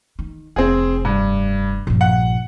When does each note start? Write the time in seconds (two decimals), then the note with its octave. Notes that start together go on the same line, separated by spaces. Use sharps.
0.19 D#3
0.56 F1 C4 G#4
1.05 G2
1.87 A#1 G2
2.01 F#5